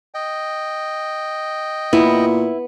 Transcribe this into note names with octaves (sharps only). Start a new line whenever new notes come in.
D#5 G5
A#2 B3 E4